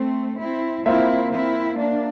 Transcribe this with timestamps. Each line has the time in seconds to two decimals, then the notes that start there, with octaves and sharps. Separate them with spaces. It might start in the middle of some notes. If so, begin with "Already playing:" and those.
Already playing: A3 C4
0.39 C4 E4
0.86 A#3 C4 E4 F4 C5 E5
1.32 C4 E4
1.78 A#3 D4